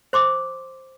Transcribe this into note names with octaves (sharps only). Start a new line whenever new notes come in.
C5 C6 D6